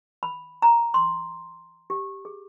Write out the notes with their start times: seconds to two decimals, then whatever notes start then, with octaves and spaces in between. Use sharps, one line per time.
0.23 B5
0.62 A#5
0.94 C6
1.90 G4
2.25 G#4